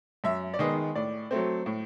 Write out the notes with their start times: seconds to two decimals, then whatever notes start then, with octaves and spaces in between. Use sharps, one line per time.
0.24 F#2 E5
0.54 D5
0.59 D#3 G#3 B3 D#5
0.95 A2 D5
1.31 F#3 A3 C4
1.66 A2